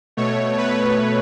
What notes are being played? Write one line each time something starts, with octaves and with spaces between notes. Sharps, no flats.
B2 A3 C#5
B4